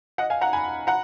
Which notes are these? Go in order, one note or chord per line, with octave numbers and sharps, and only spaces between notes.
D#5 F#5
F5 G#5
F#5 A#5
G#5 B5
F#5 A#5